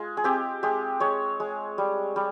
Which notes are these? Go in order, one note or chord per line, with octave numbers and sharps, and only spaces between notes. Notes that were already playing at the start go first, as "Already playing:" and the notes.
Already playing: G#3 F4
G#4
C4 G4
G#3 G4
G#3 C#5
G#3
G3
G3